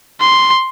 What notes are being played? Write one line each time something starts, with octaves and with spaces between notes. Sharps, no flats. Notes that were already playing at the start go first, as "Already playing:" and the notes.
C6